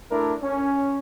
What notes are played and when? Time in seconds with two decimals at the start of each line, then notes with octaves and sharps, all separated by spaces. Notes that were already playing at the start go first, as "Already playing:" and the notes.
0.10 A3 D4 E4 A#4
0.42 C#4